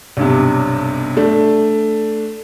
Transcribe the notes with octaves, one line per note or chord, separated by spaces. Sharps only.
B1 G2 C3
A3 D4